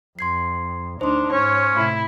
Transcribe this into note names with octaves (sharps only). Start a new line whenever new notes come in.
F2 C6 G#6 C7
D2 D4 D#4 C5 C6
G#2 C#4 C#5
A2 C3 E4